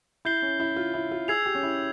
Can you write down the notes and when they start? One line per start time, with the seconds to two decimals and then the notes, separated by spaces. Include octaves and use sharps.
0.25 E4 G6 C7 G7
0.42 C#4
0.60 E4
0.76 F4
0.94 E4
1.11 F4
1.28 G#4 E6 G#6 C7 F7
1.46 G4
1.55 C#4
1.63 E4